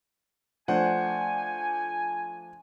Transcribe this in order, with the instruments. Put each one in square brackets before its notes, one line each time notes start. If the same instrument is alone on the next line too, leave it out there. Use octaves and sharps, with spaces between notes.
[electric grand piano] F3 A3 D4 [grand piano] C5 D5 F#5 [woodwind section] G#5